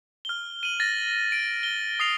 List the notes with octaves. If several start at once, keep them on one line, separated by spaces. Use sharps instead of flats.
F6 G7
D#7 F#7
A6 A#6
D7
G7
D#6 C7 F7